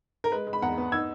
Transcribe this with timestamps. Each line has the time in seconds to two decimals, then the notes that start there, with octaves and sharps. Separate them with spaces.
0.24 A#4
0.32 G#3 B4
0.47 G#3
0.53 B5
0.62 E2 F#5 A#5
0.78 B3
0.92 D#4 E6 G#6